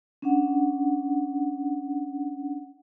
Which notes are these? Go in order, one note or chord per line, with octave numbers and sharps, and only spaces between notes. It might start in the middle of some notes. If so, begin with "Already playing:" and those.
C#4 D4 F#5